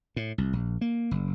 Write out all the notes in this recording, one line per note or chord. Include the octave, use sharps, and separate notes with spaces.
A2
C2
A#1
A#3
F#1